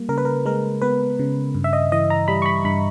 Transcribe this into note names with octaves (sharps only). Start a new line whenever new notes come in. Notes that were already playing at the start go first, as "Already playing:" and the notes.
Already playing: G3 A#3
C#3 A#4
B4
A#4
G#3 A#4
B3 B4
C#3
G2
E5
D#5
E3 D#5
A#5
G3 B5
C#6
B5
G2 B5